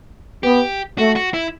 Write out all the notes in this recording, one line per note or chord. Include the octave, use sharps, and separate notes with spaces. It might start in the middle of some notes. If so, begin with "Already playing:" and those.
B3 G4
A3 F#4
F#4
E4